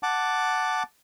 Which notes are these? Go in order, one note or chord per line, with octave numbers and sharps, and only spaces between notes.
F#5 A5 D6